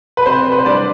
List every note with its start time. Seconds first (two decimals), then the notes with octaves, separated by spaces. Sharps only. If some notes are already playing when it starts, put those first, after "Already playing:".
0.17 B4
0.26 C3 C5
0.52 B4
0.58 C5
0.66 G3 D4 D5